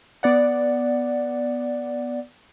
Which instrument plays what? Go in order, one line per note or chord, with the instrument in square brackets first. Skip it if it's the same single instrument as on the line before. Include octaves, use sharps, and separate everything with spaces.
[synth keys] B3 D5 F#5